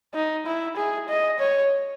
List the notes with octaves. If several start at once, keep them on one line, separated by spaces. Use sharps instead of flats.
D#4
E4
G#4
D#5
C#5